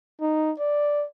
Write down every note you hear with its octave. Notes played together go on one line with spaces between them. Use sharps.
D#4
D5